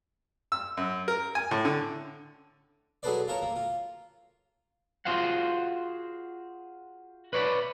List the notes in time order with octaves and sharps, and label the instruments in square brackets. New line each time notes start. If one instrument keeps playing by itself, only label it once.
[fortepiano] E6
F#2
A#4
G#5
A2
D3
[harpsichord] F#3 G#4 A4 B4 C5 D5
F4 A4 A#4 C#5
A#3
F4
[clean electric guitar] F4 F#4 G#4 C5 F5 F#5
B4 C#5 D5 B5